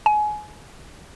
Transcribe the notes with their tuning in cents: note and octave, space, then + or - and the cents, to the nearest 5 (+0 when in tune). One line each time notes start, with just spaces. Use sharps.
G#5 +25